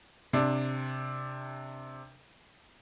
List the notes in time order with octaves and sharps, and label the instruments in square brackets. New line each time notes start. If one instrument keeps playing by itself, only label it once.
[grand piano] C3 D4